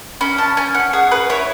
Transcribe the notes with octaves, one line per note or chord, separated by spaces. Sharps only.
C#4 B5
A5
C#4 G#5
F#5
G#4 F#5
B4
E4 C#5